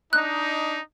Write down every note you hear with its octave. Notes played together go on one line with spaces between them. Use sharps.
D4 D#4 F#6